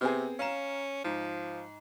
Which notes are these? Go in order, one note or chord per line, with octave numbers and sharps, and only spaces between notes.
C3 B3 C4 G#4
C#4 F5 A#5 E7
G#2 F3